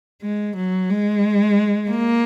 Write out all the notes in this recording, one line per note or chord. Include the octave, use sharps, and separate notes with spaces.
G#3
F#3
G#3
A#3